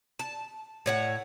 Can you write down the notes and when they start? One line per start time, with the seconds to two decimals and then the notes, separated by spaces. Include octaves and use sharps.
0.19 A5
0.86 A2 C#5 F#5